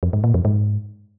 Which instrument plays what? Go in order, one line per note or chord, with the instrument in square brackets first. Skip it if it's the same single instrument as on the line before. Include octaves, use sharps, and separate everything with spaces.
[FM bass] F2
G#2
A#2
F2
G#2